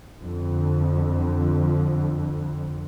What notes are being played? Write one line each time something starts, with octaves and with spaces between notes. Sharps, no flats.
F2 D3